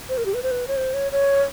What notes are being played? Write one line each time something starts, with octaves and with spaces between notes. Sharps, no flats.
C5
A#4
G4
B4
C5
B4
C#5
C5
C#5
C#5